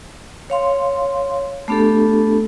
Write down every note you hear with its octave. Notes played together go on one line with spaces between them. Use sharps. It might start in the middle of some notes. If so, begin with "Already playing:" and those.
C#5 F5 C6
A3 B3 D4 G4 A4